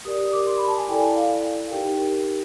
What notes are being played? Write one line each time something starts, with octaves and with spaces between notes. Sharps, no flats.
G4 A#4 D5 D#6
D#6
D6
C6
B5
A5
G#5
E4 A4 D5 G5
F5
D#4 G4 A#4 G5